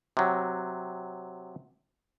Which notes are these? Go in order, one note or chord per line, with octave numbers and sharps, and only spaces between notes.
C3 F#3